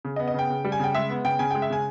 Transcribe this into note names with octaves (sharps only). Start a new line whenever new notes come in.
C#3
D#5
B3
D#5
C#3 G5
C#3
G3
G#5
C#3 G5
G#3 E5
B3
C#3 G5
C#3 G#5
G#3 G5
E5
C#3 G#5